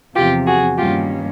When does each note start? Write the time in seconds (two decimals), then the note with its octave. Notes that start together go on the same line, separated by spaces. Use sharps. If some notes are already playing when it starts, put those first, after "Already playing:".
0.14 E2 C3 F3 F4 G4
0.45 F#4 G#4
0.77 G2 D#3 G3 A#3 C#4 F4 G4